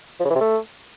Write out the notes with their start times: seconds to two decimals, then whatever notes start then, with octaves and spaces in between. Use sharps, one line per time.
0.20 F3
0.25 C#3
0.30 E3
0.35 C3
0.41 A3